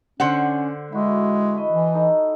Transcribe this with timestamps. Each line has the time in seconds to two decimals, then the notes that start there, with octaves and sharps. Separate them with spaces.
0.20 D3 C#4 C5 F#5
0.92 G#3 E4 F#4
1.55 D#5 A5 B5
1.71 E3
1.94 D#4 A4 A#5